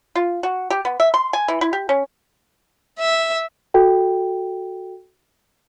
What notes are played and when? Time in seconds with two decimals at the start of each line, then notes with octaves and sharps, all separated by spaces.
0.15 F4
0.43 F#4
0.70 G4
0.85 B3
1.00 E5
1.14 C6
1.33 G#5
1.48 E3
1.61 E4
1.73 G4
1.89 C#4
2.99 E5
3.74 F#4 A4 G5